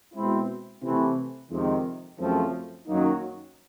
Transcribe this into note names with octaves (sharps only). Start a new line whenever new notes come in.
B2 G#3 C4 E4
C3 E3 A3 C4 E4
F2 C3 D#3 G#3 C4
F#2 C#3 F3 A3 C4
F#2 D#3 F#3 A#3 D#4